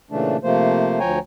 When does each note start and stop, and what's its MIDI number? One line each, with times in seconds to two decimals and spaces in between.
0.11 0.37 46
0.11 0.37 49
0.11 0.37 52
0.11 0.37 57
0.11 0.37 62
0.43 0.99 48
0.43 0.99 53
0.43 0.99 57
0.43 0.99 58
0.43 0.99 72
1.00 1.19 38
1.00 1.19 53
1.00 1.19 73
1.00 1.19 79
1.00 1.19 80
1.00 1.19 82